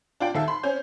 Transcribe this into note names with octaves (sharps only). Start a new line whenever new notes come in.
D4 F4 G5
D#2 A4 E5 F5
B5 C6
C4 C#4 G6